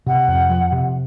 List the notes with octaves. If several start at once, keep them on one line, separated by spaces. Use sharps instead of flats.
C3 F#5
F2
F3
C3